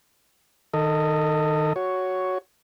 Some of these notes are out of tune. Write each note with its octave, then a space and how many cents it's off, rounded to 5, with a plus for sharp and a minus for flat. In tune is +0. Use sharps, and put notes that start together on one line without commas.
D#3 +0 A4 +30 D#5 +0
F#4 +0 C#5 +5